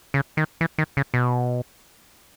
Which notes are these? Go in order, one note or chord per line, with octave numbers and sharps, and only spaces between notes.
C#3
D#3
E3
D#3
C#3
B2